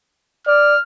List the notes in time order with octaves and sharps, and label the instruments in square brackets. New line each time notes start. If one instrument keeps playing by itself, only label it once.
[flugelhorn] D5 [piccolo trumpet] F6